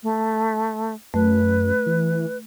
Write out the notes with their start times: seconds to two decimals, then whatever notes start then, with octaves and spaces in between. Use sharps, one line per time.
0.03 A3
1.14 F#2 A3 B4
1.86 E3